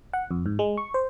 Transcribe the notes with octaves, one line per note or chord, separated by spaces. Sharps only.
F#5
F2
G#2
G#3
C#6
C5